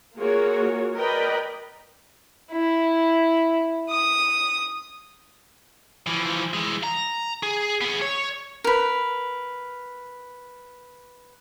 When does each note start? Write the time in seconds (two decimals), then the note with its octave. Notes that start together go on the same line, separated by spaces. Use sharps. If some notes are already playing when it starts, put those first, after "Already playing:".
0.18 A#3 F4 F#4 G#4 A#4 C#5
0.97 A#4 B4 D5 D#5 G5 B5
2.52 E4
3.90 D#6
6.07 E3 F3
6.54 E3 G#3
6.83 A#5
7.43 G#4
7.81 B3 G#4
8.02 C#5
8.64 A#4 B4